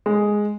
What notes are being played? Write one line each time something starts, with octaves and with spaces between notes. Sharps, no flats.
G#3